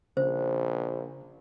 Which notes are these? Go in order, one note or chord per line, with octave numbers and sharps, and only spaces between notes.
A#1 C#3 C5